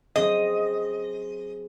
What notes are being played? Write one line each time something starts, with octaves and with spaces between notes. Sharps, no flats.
F#3 C4 G#4 D#5